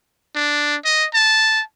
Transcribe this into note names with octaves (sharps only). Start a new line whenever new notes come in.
D4
D#5
A5